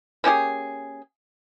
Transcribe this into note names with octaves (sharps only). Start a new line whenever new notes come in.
A#3 C#4 G4 G#4